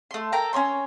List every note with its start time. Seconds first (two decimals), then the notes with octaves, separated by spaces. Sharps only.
0.11 A3 C6
0.32 A4 A#4 G5 A#5
0.53 C#4 D#4 C#5 C6